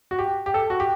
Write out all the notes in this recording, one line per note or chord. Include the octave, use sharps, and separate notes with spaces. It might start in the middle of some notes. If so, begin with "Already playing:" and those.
F#4
G4
G4
A4
F#4
G4